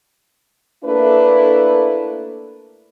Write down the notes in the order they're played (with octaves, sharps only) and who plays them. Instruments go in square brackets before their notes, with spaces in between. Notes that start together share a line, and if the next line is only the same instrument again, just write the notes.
[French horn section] A3 A#3 D4 E4 A4 B4